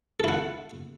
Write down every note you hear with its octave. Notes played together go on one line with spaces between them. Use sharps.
E4 A4 F#5